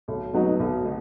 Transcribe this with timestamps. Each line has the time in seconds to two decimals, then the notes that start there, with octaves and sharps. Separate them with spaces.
0.08 B1
0.33 B2 F#3 B3 D#4
0.59 B1
0.85 B2